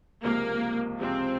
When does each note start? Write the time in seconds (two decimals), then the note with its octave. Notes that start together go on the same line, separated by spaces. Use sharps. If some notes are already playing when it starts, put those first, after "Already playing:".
0.23 C#2 C3 F3 A#3
0.99 C#2 C3 F3 C4